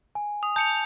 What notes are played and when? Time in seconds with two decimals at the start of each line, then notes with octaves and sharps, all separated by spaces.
0.15 G#5
0.43 D#6
0.56 A5 G6 C#7 F7